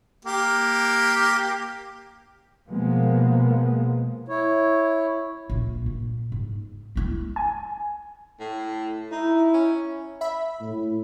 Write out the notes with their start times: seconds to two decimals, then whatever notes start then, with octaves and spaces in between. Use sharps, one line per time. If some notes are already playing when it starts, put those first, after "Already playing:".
0.25 A#3 G4
2.67 B2 F3 G#3 A#3 B3
4.28 E4 C#5
5.50 A#1 F4
5.86 A#2
6.32 G#2
6.96 G#3 E4
7.36 G#5
8.40 A2
9.12 D#4 E4
9.54 C#4
10.21 E5 B5
10.62 A2